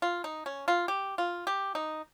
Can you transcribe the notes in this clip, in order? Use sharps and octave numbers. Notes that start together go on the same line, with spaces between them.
F4
D#4
C#4
F4
G4
F4
G4
D#4